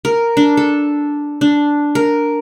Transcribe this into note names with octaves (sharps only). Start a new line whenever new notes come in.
A#4
D4
A4
D4
A#4